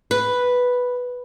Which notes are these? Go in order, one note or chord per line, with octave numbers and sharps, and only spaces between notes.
B4